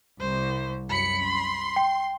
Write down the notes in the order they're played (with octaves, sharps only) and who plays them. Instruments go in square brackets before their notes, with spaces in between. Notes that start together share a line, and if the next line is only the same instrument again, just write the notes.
[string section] C2 [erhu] C5
[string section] F#2 C#7 [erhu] B5
[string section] C6
[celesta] G5